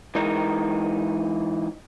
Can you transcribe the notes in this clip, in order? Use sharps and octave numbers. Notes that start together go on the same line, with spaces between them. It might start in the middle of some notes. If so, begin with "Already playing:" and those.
E3 G#3 D#4 A#4